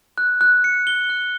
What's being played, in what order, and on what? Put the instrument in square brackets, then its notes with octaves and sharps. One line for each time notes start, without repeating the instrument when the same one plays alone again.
[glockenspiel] F#6
F#6
C#7
G7
F#6